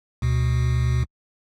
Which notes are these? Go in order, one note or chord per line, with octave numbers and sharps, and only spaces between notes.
D2 B2